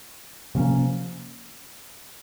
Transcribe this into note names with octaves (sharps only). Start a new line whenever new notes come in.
C3 F3 A#3 C#4